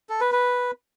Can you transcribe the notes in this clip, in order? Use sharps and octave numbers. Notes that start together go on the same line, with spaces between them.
A4
B4
B4